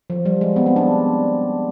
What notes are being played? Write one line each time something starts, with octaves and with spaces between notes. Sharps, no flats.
F3
G3
G#3
B3
C4
D4